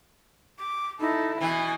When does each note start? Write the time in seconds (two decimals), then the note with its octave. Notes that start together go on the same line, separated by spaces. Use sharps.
0.59 D6
1.00 D#4 E4 A4
1.41 B2 E3 G#5 B5